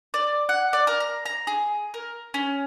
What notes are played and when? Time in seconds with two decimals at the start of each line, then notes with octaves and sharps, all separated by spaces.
0.14 D5
0.49 F#5
0.73 D5
0.87 A#4
1.00 A#5
1.26 A#5
1.47 G#4
1.94 A#4
2.34 C#4